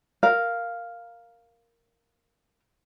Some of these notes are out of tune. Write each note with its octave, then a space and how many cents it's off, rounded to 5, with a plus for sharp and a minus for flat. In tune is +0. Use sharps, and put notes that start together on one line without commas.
A#4 +0 F5 +0